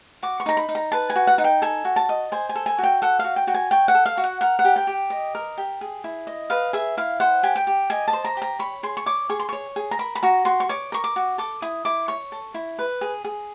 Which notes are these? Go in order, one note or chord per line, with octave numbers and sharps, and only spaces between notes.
F#4 D6
C#6
D#4 A#5
B5
D#4
A#5
B4 A5
G#5
F#4
F#5
D#4 F#5
G5
A4 G#5
F#4
A5
D#5
C5 G#5
G#5
A4
G#5
F#4 G5
A4 F#5
F5
F#4
G5
F#4 G5
G#5
C#5 G5
F#5
A4
F5
F#4
F#5
A#4 F#5
F#5
G4
G5
G4
D#5
A#4
G4
G#4
E4
D#5
B4 F5
G#4 E5
E4 F5
C5 F#5
G4 G#5
G5
G4
D#5 G#5
A5
C5
A#5
G4 A#5
C#5 B5
G#4 C6
C#6
C#5 D6
G#4 C#6
C6
C#5 C#6
G#4
A#5
A#4 B5
B5
F#4 A#5
F#4 C6
C#6
C#5 D6
A#4 C#6
D6
F#4
A4 D6
E4 D#6
E4 D6
C#5 C#6
A4
E4
B4
G#4
G#4